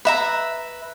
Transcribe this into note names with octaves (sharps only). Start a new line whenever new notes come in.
B4 E5 A#5